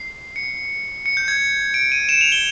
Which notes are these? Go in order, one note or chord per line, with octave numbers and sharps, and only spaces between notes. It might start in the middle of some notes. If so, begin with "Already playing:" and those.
Already playing: C7
C#7
C#7
G6
G#6
D7
D#7
E7
F7
G7